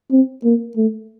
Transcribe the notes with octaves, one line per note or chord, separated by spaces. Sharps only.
C4
A#3
A3